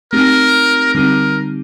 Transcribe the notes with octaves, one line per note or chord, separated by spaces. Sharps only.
A3 C4 D#4 G4 A#4
D3 G3 C4 D#4 G4 A#4